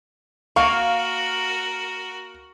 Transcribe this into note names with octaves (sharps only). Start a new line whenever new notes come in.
A#3 F#4 A#4 F5 C#6